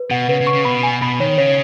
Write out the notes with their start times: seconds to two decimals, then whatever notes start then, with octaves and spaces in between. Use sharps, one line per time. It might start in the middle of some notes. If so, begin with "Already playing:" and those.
Already playing: B4
0.10 B2 F#5
0.29 C#3 B4
0.41 C#3
0.47 C#6
0.53 C#3
0.65 B2 B5
0.83 G#5
1.02 B2 B5
1.20 D#3 C#5
1.38 C#3 C#5